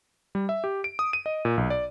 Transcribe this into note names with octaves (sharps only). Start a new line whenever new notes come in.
G3
E5
G4
D7
D#6
D#7
D#5
A#2
B1
D5